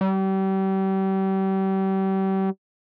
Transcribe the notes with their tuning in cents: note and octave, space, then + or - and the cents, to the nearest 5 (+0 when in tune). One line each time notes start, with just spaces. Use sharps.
G3 -35